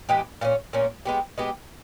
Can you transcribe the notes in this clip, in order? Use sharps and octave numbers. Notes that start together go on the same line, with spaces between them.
E3 G#3 B3 G4
A#2 A#3 C#4
A#2 A#3 C#4
G#3 B3 G4
G#3 B3 G4